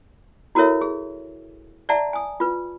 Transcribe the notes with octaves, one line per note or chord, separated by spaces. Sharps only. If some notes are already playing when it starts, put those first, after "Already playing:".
E4 F#4 A4 A#4 C#5 E5
G#4
D5 E5 F#5 A5 A#5
G#5 D#6
F4 B4